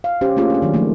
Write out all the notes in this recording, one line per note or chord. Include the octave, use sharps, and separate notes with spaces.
F5
C#4 G4 C5
A3 A#3 C#4 F4 G#4
C#4 D4
D#3 F#3
F3 F#3 A3 A#3